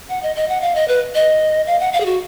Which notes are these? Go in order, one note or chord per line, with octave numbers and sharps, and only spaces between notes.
F#5
D#5
D#5
F#5
F5
D#5
B4
D#5
F5
F#5
F5
G#4
F#4